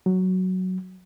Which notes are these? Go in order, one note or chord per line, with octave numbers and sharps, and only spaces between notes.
F#3